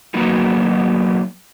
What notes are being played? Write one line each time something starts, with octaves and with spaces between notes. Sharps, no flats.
F#3 A#3 B3 D#4 F#4